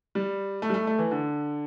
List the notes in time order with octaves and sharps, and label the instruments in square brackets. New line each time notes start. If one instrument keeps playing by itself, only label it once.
[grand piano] G3
A3
G3
A3
A3
E3
D3